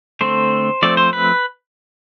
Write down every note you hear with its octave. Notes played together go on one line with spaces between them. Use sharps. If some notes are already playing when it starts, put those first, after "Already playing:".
D3 A3 C4 C5
F3 A3 C4 D5
C5
B4